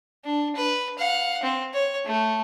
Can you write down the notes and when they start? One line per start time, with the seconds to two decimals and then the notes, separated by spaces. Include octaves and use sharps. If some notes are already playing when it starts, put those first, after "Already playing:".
0.24 D4
0.56 B4
0.99 F5 F#5
1.43 C4
1.73 C#5
2.05 A3